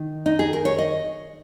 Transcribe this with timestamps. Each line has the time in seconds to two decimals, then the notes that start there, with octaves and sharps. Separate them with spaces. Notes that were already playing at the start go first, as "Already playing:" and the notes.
Already playing: D#3
0.26 D#4
0.39 G#4
0.53 A#4
0.65 C#5
0.79 D#5